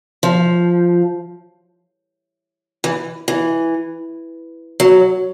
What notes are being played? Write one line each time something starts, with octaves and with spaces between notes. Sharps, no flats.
F3
E3
E3
F#3